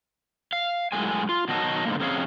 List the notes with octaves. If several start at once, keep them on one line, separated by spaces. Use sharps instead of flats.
F5
F#2 A2 G#3 G#5
F4
B2 D#3 F#3 D#5 A5
G#2 D3 A#3
F2 C3 C#4 F#4 G#4 F5